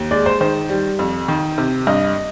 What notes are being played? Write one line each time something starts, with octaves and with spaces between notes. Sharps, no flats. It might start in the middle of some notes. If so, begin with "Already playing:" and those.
Already playing: D#2
G#3 D5
C5
D#3 C5
G3
F2
D#3
C3
G2 D#5